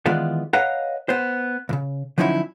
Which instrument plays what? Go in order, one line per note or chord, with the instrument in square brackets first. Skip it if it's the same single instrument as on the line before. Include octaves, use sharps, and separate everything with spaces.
[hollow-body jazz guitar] D#3 E3 G#3 B3 F4 D5
B4 C#5 D#5 F5 F#5 A#5
B3 C5
C#2 C#3
D3 F3 F#3 C#4 D#4 E4